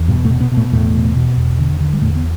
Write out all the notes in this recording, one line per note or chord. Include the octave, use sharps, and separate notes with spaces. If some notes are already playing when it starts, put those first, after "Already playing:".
Already playing: E2
G2 B2 G3
A2 A3
B2
B2 B3
B2
A2 A3
E2 A2 A3
B2
B2
E2
D3
D3
G3
E2 A2 A3
B3